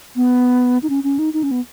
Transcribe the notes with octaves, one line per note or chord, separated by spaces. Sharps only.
B3
D#4
C#4
C#4
D#4
D#4
C#4
B3